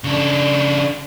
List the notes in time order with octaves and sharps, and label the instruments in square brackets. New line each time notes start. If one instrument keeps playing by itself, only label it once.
[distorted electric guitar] C#3 D4